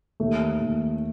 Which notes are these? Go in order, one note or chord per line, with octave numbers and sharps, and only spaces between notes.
D#2 A3
D#2